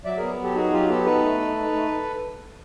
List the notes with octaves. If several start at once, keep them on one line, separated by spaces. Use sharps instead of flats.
F#3 D5 E5
B3 G#4 A#4
F#3 G4 A4
D#4 F#4 G#4
F#3 F4 G4
B3 G4 A4
D#4 A4 B4
A3
D#4
D#4
A3